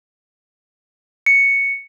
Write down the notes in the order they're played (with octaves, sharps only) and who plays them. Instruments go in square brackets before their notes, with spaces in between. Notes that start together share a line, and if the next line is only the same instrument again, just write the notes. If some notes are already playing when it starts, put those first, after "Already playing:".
[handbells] C#7